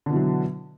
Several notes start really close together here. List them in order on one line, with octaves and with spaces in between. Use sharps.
D3 B2 E3 F#3